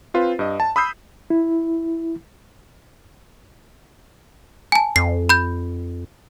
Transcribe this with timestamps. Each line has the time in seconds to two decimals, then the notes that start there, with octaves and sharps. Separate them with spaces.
0.14 C4 F4 B4 C5
0.39 G2 D#5
0.60 A5
0.76 B5 D#6 E6 G6 C7
1.30 E4
4.72 G#5 A5
4.96 F2 C7
5.29 B5 G6